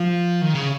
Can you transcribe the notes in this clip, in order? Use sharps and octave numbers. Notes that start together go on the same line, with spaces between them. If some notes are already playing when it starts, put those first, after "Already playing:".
Already playing: F3
D#3
C#3